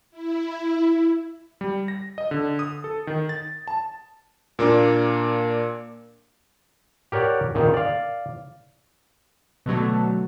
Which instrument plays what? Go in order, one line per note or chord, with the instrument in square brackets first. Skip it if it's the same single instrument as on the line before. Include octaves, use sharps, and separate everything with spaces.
[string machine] E4
[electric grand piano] G3
A#6
D#5
D3
D#6
A4
D#3
A6
A5
A#2 A#3 D4
[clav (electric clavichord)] G4 A#4 C#5 D5 F#5
A#2 D#3
D5 F5
[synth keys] B2 D3 F#3 A3